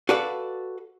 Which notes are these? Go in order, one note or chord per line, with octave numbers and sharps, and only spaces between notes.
F#4 A4 B4 D5 F5 F#5